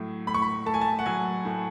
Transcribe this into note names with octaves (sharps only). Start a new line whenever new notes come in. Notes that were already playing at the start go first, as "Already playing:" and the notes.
Already playing: A2 F#3
A2 B5
C#6
B5
A3 A5
G#5
A5
F#5
F#3 G#5
A2